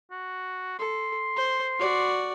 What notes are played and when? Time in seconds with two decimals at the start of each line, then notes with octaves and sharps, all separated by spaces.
0.11 F#4
0.79 A4 C6
1.36 C5
1.79 F#4 D5